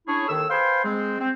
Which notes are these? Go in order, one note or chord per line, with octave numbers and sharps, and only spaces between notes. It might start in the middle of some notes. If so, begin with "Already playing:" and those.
C#4 D4 E4 G#4 C#5
D#2 D#3 A4 E6
B4 C5 F5 G5 G#5 C6
G#3 C4
C4